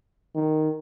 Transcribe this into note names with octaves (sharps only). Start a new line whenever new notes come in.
D#3